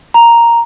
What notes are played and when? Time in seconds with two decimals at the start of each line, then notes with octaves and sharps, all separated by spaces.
0.14 A#5